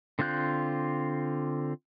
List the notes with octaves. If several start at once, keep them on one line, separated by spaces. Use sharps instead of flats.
D3 C4 F4 F#6 G6